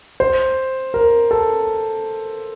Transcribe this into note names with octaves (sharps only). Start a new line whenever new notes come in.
C5
A#4
A4